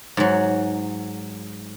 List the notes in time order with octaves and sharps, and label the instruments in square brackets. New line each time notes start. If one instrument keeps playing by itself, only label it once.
[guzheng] G#2 F#3